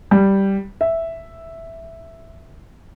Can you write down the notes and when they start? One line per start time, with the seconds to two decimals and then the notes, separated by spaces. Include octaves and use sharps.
0.11 G3
0.81 E5